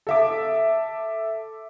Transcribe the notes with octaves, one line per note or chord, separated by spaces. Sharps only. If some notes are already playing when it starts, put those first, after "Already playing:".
A4 E5 D6